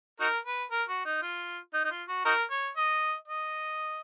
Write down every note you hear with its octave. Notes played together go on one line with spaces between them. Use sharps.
D#4 F#4 A#4
B4
A#4
F#4
D#4
F4
D#4
D#4
F4
F#4
D#4 F#4 A#4
C#5
D#5
D#5